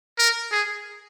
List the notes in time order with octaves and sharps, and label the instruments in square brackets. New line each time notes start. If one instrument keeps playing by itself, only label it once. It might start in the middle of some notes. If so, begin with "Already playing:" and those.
[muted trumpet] A#4
G#4